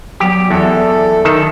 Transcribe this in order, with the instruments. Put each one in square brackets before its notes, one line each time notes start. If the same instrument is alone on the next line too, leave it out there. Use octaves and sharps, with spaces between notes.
[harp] F#3 B3 D5 [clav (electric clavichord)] G4
[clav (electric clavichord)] E2 [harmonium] A4 [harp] E5 F#6
[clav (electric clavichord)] D#3 A4